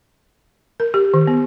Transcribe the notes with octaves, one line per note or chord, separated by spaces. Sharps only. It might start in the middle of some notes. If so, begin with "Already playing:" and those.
A#4
G4
D#3
B3